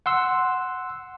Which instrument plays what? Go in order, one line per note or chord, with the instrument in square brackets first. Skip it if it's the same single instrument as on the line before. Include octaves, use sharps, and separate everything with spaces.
[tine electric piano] F#5 C6 E6